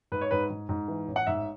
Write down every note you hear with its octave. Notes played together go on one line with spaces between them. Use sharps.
G#2 B4
C#5
G#2 B4
G#2
G#2
E3
A1
F#5
G#2 E5